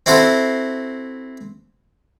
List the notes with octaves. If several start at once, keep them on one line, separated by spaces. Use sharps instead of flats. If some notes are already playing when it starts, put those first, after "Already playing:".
C4 E4 F#4 A4 C5